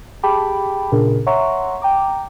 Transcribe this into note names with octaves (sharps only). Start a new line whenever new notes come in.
G4 G#4 G5 A5 B5 D6
A#2 C#3 D4 G#4 A#4
C#5 E5 F#5 A#5 C6 C#6
G5 A#5 D6